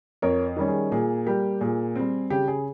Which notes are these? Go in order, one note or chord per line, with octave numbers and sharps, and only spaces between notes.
F2 A#4 C#5
D#3 G3 C#4
G#4
A#2 G#4
G3 A#3 G4
A#2 G#4
G3 C4
C#3 G4
G#4